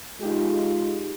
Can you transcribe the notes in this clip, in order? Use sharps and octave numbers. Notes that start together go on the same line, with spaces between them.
G#3 D#4 F4 G4 G#4